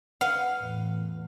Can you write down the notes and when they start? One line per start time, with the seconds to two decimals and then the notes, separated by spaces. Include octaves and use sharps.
0.21 B4 F5 F#5
0.57 E2 A2